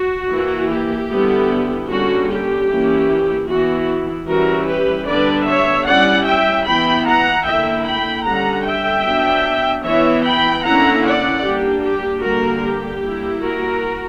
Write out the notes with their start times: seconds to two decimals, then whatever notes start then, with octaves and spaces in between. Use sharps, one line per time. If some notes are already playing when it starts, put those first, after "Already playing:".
Already playing: F#4
0.30 E3 A#3 E4
0.69 G4
1.10 D3 G3 B3 E4
1.89 D3 G3 A#3 C#4 F#4
2.29 G4
2.69 E3 A#3 C#4 E4
3.49 E3 B3 E4 F#4
4.28 E3 G3 C#4 E4 F#4 A#4
4.68 G4 B4
5.07 D3 G3 B3 D4 B4 D5
5.47 C#5 E5
5.87 G3 C#4 E4 D5 F#5
6.26 E5 G5
6.66 E3 B3 E4 G5 B5
7.06 F#5 A#5
7.46 D3 A#3 E4 E5 G5
7.86 G5 B5
8.25 D3 G3 C#4 F#5 A#5
8.66 E5 G5
9.05 F#3 B3 D4
9.85 E3 B3 E4 C#5 E5
10.25 G5 B5
10.64 D3 A#3 C#4 E4 F#5 A#5
11.04 D5 F#5
11.44 G3 A#3 D4 G4
11.84 G4
12.24 D3 G3 A#3 F#4 A#4
12.64 G4
13.04 G3 A#3 E4
13.43 F#4 A#4